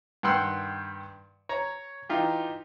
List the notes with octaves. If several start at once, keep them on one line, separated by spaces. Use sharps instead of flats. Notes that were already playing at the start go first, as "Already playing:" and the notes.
G2 D#3 F#5 G5 C6 E6
C#5 A#5
E3 D#4 F4 G4